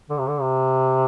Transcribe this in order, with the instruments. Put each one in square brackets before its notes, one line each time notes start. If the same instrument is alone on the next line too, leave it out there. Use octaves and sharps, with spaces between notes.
[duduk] D3
C3
D3
C3